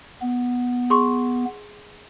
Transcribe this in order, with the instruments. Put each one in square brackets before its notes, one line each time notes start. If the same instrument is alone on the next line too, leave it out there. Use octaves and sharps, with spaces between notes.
[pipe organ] B3
[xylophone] G#4 C6 C#6